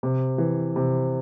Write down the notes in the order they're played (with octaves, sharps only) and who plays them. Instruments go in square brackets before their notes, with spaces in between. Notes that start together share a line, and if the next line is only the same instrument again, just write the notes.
[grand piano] C3
E3
C3